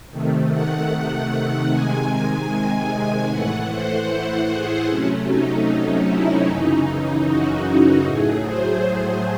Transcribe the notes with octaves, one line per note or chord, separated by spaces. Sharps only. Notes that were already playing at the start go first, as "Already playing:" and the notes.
C3 D#3 A3
F#5
C3 D#3 G#3 G#5
G#5
A2 E3 A3 F#5
C5
G#4
C3 F#3 A3 C#4
D#4
E4
F#2 C#3 E3 D#4
F#4
A2 F#3 A3 G#4
C5